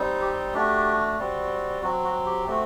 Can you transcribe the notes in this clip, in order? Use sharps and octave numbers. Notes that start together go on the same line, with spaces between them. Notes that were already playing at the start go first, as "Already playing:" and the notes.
Already playing: G3 C4 D#4
G4
A3 D4 F#4 G4
G3 C4 F#4
F#3 C4 F#4
F#4
G4
A3 C4 F#4